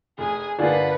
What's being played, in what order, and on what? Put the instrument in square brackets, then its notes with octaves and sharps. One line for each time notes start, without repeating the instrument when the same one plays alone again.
[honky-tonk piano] F1 [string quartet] G#4 G#5
[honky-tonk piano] G1 A#3 [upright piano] D4 F4 G#4 [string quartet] B4 F#5